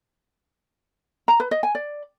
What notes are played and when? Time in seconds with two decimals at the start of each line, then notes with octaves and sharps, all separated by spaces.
1.28 A#5
1.40 B4
1.51 D#5
1.63 G#5
1.75 D5